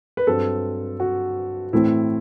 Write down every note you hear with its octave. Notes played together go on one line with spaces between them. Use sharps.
B4
G2 F#3 C4 A4
F#4
A2 E3 A3 C4 E4